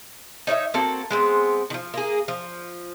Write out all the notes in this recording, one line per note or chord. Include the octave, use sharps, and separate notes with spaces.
D#4 C#5 D5 E5
A#3 C4 F#4 A4
G#3 B3 C4
D#3 F3
A#3 G#4
F3